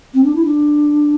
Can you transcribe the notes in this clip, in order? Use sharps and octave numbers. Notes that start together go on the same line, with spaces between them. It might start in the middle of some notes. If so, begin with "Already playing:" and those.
C4
D4
E4
D4